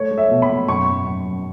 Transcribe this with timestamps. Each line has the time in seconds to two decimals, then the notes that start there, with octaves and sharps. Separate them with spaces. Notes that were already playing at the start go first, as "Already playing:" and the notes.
Already playing: A3 C#5
0.11 A3
0.18 E5
0.31 B2
0.42 B5
0.50 B2
0.67 F#2 C#6
0.87 F#2
1.06 F#2
1.25 F#2